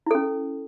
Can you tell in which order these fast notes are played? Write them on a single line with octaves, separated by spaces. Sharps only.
E4 A4 C#4